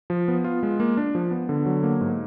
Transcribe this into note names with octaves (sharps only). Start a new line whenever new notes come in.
F3
B3
F4
G#3
A#3
D4
F3
B3
D3
F#3
A#3
G#2